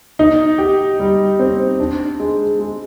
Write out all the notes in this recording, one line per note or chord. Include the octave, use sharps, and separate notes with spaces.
D#4
G4
G3
C4
D4
G#3
G#3